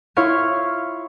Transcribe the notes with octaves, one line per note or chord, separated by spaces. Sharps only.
E4 F4 C#5 F5